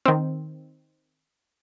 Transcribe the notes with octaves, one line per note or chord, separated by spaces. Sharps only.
D#3 C4